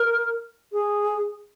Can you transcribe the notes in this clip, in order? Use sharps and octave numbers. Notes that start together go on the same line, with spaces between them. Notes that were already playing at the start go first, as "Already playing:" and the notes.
Already playing: A#4
G#4